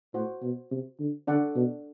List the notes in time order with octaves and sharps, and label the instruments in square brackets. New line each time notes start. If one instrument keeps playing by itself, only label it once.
[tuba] A2 [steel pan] F#4 C5 F#5
[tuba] B2
C3
D3
[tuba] D3 [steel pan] D4 A4 D5 F#5
[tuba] B2